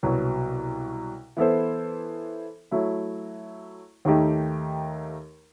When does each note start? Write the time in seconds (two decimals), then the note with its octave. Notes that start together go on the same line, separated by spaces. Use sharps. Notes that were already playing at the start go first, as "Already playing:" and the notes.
0.03 C2 B2 F#3
1.37 E3 B3 E4 A4 C5
2.71 F#3 A3 E4
4.05 D#2 D#3 A3 D#4 G4